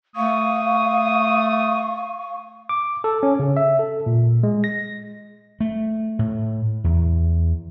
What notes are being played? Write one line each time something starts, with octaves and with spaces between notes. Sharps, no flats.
A3 F5 C#6 D#6
D6
A4
C#4
C#3
E5
A4
A#2
G#3
A#6
A3
A2
E2